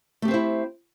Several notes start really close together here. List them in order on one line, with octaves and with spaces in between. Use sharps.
A3 G4 C4 C5 E4